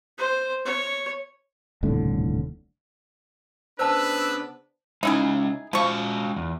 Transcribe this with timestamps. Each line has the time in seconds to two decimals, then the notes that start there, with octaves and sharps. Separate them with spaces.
0.18 C5
0.65 C#5
1.83 D#1 C2 A2 D3
3.79 C#3 B3 D4 B4 C5 A5 E6
5.03 G#3 C#4 D#4 E4 G#4
5.73 F3 G#3 F#4 F5 C#6
6.36 E2